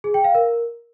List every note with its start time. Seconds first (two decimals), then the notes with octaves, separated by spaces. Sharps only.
0.04 G#4
0.14 G5
0.24 F5
0.35 A#4